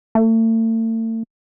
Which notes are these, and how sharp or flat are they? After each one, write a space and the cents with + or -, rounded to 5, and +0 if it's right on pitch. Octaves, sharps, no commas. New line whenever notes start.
A3 +40